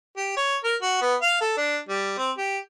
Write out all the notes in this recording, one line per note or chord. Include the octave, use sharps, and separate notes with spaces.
G4
C#5
A#4
F#4
B3
F5
A4
D4
G3
C4
G4